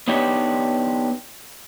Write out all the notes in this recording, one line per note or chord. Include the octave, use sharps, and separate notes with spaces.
B3 D4 D#4 G4 C#5